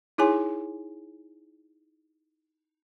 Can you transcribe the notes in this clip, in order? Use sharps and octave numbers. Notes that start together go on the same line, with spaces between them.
D#4 E4 G#4 C#5 G#5 C6